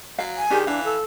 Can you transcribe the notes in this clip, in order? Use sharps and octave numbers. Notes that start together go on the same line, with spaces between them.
F#3 F5
G#5
D#3 D4 G4 G#4
E3 D4 F5
A4